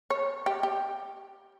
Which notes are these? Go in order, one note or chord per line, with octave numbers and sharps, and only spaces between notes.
C#5
G4
G4